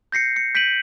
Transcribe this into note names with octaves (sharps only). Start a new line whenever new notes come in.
G6 A#6 C7 C#7
C#7
G6 B6 D7 D#7 F#7